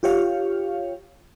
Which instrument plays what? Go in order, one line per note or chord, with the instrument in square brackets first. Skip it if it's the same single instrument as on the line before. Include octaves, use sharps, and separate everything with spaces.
[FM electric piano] F4 G4 C#5 F5